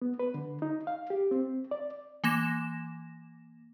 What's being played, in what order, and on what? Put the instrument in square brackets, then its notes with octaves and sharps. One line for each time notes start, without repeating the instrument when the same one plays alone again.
[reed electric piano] B3
B4
D3
D#4
F5
G4
C4
D5
[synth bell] E3 A#3 A#6 E7